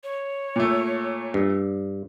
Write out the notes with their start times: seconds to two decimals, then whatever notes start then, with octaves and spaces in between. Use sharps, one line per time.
0.04 C#5
0.56 A#2 A3
1.34 G2